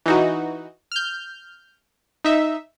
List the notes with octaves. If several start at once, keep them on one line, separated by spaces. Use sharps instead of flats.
E3 D#4 F#4
F6 G6
D#4 E5